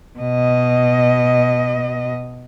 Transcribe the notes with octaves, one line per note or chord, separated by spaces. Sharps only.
B2 D#5